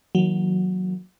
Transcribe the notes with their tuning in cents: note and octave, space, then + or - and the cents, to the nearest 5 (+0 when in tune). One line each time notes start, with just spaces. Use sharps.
D#3 +45 F#3 -5 A#3 +0